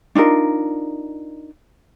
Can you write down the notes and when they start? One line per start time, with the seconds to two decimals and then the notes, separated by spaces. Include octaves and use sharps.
0.15 D4 D#4 F4 A#4